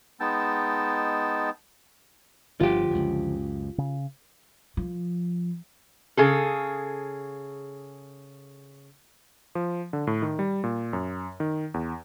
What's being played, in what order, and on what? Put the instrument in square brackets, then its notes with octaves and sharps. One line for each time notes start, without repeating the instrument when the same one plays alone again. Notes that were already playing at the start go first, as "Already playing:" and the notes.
[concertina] G#3 B3 D#4 G5 A5 E6
[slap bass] G1 [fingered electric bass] D3 F3 [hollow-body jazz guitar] F4 G4
[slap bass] C#2 F#2
[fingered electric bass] C#3
[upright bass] F3
[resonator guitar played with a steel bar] C#3 G#4 A4
[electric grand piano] F3
D3
A2
D#3
G3
A#2
F#2
D#3
E2